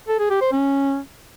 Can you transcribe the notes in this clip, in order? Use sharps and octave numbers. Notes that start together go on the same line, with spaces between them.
A4
G#4
G4
C5
C#4